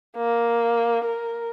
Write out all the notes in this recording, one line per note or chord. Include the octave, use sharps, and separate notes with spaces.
A#3
A#4